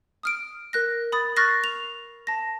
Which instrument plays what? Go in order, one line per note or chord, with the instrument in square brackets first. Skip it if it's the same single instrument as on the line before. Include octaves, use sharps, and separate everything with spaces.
[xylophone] D#6 F6 D7
A#4 F#6 A#6
B5 D#6 A6
C#6 F6 F#6 A6 A#6 C7
F7
A5 A#6